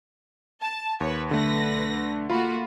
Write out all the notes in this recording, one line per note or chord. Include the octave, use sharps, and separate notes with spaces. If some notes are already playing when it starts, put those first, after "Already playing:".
A5
D#2 B4 C#5
B1 D3 A3 B4 A#6
A3 A#3 F4 F#4 B5